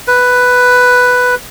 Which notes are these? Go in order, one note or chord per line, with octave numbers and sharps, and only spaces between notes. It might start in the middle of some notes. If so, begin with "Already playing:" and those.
B4